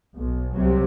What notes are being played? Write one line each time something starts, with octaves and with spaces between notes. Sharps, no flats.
B1
C2 C3 F#3